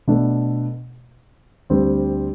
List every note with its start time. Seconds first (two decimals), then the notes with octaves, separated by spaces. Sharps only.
0.08 B2 A3 D4
1.70 D2 D3 G3 C4